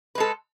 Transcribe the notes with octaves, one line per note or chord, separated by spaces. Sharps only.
G#3 A4 B4